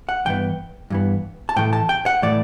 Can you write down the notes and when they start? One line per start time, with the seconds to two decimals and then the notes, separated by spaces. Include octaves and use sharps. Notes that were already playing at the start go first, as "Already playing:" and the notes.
0.09 F#5
0.25 G2 E3 B3 G5
0.90 G2 E3 B3
1.49 A5
1.56 A2 E3 A3 G5
1.73 A5
1.89 G5
2.06 F#5
2.22 A2 E3 A3 D5